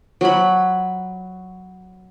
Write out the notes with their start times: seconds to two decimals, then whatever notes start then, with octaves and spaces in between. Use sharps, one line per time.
0.21 F#3 B5